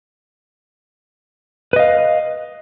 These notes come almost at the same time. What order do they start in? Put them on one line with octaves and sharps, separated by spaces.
B4 D#5 F5